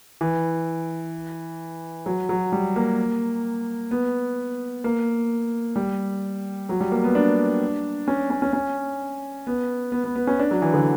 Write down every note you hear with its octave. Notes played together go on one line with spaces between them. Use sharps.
E3
F#3
F#3
G3
A#3
B3
A#3
G3
F#3
G3
A#3
B3
D4
C#4
C#4
C#4
C#4
B3
B3
B3
B3
C#4
D4
F#3
E3
D3